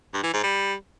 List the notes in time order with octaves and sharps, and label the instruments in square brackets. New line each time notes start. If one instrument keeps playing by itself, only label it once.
[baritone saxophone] G2
E3
G#2
G3